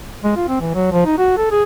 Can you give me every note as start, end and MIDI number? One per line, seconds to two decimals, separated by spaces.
0.24 0.31 56
0.36 0.45 65
0.48 0.59 60
0.60 0.71 52
0.74 0.89 54
0.92 1.05 53
1.05 1.16 63
1.18 1.32 66
1.37 1.51 69
1.51 1.63 68